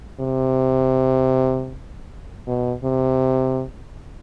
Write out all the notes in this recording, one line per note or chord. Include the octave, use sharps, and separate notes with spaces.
C3
B2
C3